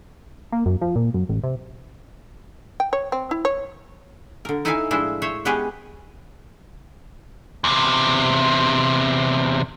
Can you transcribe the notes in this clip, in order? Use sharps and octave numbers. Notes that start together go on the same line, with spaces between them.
A#3
F#2
F3
A#2
F#2
A1
C3
G5
C#5
C4
E4
C#5
D3 A#4
D#4 E4 A4 E5 F5 G#5
A2 F3 G#3 D4 E4 C5
C5 C#5 E5
G#3 B3 C#4 G4 G#4 B4
E2 C3